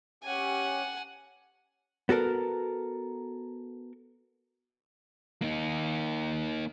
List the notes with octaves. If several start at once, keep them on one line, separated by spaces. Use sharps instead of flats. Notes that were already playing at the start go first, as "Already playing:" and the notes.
C#4 G4 F#5 G#5
B3 F#4 A4 A#4
A#3 D#4